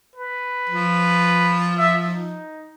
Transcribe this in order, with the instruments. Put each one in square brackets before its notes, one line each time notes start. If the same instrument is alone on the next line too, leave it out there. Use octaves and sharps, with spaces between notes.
[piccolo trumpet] B4
[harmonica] F3
[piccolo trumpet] E5
D#4